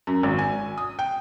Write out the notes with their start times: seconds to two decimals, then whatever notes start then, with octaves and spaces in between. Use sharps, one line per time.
0.07 F#2
0.23 G#1
0.38 G#5
0.78 D#6
0.99 G5